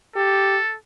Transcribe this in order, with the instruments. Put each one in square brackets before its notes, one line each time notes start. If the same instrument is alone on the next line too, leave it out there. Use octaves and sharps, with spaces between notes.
[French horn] G4 [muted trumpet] A4